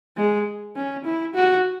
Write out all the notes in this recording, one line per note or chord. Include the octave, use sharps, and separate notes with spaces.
G#3
C#4
E4
F#4